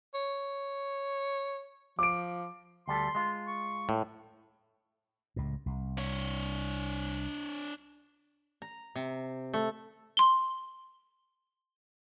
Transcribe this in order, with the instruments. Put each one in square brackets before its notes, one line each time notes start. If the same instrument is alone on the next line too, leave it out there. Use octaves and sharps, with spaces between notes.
[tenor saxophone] C#5
[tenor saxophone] F3 [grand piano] D6 D7
[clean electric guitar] D2 G3 A4 [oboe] C6
[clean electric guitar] G#3 F4
[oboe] C#6
[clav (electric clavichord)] A2
[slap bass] C#2 A2
C2
[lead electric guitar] D4 C#5
[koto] A#5
C3
A3
[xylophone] C6 G7